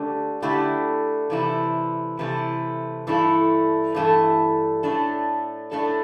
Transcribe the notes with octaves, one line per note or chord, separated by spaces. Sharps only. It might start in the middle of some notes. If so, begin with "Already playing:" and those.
Already playing: D3 A3 G4
D3 A3 E4 G4
C3 E3 A3 E4
C3 E3 A3 E4
G2 E3 A3 E4 A4
G2 E3 A3 E4 A4
A2 A3 D4 A4
A2 A3 D4 A4